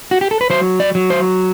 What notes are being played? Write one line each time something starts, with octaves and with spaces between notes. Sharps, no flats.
F#4
G4
A4
B4
F#3 C5
D5
F#3
C5